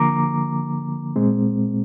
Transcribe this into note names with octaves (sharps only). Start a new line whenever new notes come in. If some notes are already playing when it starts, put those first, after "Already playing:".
Already playing: D3 F3 A#3 A#5 D6
A#2 G#3 C4